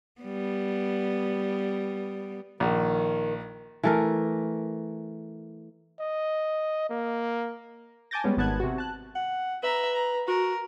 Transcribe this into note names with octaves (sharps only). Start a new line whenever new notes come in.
G3 B3
A#1 D#3
E3 A3 A#4
D#5
A#3
G#5 A5 D6 G6 A6 A#6
G3 G#3 B3 C#4
G#1 B3 A5 F#6 G#6
C3 F#4
A5 F#6
F#5
B4 E5 A#5
A#5
F#4 A#4